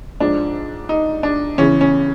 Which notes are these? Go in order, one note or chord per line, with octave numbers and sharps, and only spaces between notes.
G#2 F3 D4
D#4
D4
E2 C#3 E3 C#4
C#4